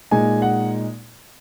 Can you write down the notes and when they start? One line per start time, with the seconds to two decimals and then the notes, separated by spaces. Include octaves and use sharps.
0.11 A#2 G#3 D#4 G#5
0.42 F#5